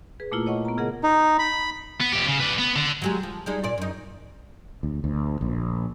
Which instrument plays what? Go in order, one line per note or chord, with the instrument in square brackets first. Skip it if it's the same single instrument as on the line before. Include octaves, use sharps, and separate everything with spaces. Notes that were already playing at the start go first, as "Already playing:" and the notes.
[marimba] G#4 B4
A#2 A3 A#3 E4 F4
C#5 D#5 F#5 C#6
B3 A#5
C#3 G#4 A#4 D#5 F#5
[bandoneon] D#4
B5
[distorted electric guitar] B3
F2 G4
C#3
B4 D5
B3
D3
[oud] F#3 G#3 G4
F3
G3 G#3 D#4
A#2 D5
F#2 D#4
[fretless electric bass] D2
D2
A#1